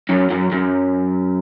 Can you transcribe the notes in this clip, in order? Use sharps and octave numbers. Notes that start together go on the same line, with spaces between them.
F#2
F#2
F#2